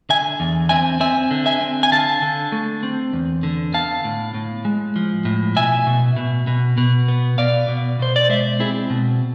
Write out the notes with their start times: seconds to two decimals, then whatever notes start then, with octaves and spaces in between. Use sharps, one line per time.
0.09 D3 E5 G#5
0.40 E2
0.69 C4 E5 G#5
1.00 C4 E5 G#5
1.31 D3
1.46 E5 G#5
1.61 C4
1.83 G#5
1.92 D3 F5 A5
2.22 D3
2.52 A3
2.83 C4
3.13 E2
3.43 D3
3.74 B3 F5 A5
4.04 A2
4.34 A2
4.65 G#3
4.96 F3
5.25 A2
5.56 B2 E5 G#5
5.87 B2
6.16 B2
6.47 B2
6.78 B2
7.08 B3
7.38 B2 D5 F5
7.69 B2
7.99 B2 C5
8.16 D5
8.29 G#3 C5 E5
8.59 C4 E4 G#4
8.90 B2